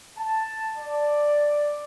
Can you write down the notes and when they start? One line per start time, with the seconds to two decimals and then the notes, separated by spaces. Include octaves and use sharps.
0.18 A5
0.78 D5